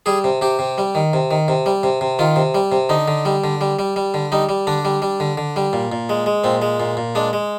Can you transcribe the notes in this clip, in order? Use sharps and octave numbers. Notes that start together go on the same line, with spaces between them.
G3 G#4
C3
C3 G4
C3
G3
D#3
C3
D#3
C3
G3
C3
C3
D#3 F4
C3
G3
C3
D3 D#4
D3
G3
D3
G3
G3
G3
D3
G3 D#4
G3
D3 D4
G3
G3
D3
D3
G3
A#2
A#2
G#3
G#3
A#2 C4
G#3
A#2
A#2
G#3 D4
G#3